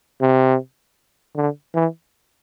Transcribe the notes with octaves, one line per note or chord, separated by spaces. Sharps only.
C3
D3
E3